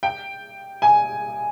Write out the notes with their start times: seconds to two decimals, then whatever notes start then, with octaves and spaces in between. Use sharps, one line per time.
0.03 G5
0.82 G#5